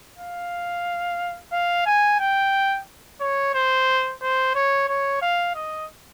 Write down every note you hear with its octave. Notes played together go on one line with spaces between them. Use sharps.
F5
F5
G#5
G5
C#5
C5
C5
C#5
C#5
F5
D#5